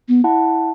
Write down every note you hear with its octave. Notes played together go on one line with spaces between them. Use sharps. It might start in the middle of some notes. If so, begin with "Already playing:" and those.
B3
E4 F#5 A5